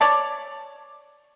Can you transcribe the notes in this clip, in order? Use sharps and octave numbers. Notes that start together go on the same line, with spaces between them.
C#5 D5 A5